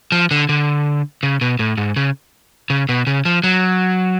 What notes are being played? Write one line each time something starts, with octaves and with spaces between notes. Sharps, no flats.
F3
D3
D3
C#3
B2
A2
G#2
C#3
C#3
B2
C#3
F3
F#3